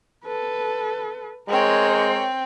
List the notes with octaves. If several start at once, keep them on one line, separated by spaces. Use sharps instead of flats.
A4 B4
G#3 C4 A#4 C#5 G5